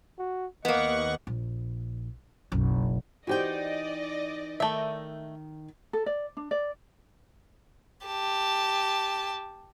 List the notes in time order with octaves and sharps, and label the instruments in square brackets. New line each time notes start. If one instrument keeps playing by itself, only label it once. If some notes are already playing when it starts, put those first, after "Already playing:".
[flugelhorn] F#4
[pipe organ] D#2 F#5 C#6 [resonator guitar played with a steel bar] A#3 B3 [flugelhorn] D#5
[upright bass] A#1
F#1 B1
[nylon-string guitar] E3 D#4 G5 [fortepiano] F#4 G4 C5 [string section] D5 D#5
[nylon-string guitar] D#3 [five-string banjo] A3 E5
[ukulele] A4
D5
D4
D5
[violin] G4 A5